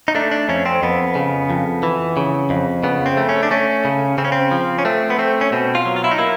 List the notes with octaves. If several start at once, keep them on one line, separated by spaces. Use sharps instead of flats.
D#4
A3 D4
D4
F2 C#4
C4
F2 B3
C#3
F2
E3
C#3
F2
C#3 B3
C4
A3
C#4
D4
A3 C#4
C#3
C#3 C4
C#4
C4
F3
C#4
A3 C4
B3
A3 C4
C#4
B2 C4
F4
F#3
F4
E4
D#4
A#3 E4